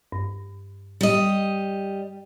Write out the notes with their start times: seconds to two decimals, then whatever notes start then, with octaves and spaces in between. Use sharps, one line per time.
0.12 G2
1.01 G3 D#5